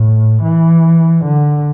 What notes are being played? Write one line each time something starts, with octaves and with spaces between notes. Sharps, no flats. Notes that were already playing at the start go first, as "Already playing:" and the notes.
Already playing: A2
E3
D3